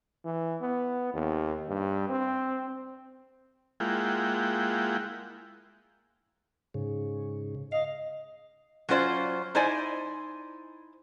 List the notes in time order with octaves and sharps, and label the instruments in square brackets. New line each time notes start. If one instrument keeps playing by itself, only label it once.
[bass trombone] E3
B3
D#2
G2
C4
[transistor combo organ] G#3 A#3 E4 F4 F#5 G5
[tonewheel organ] G#2 C#3
[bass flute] D#5 [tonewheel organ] F5
[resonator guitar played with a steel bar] F#3 C#4 F4 C5 D5
D#4 E4 C5 D5 G#5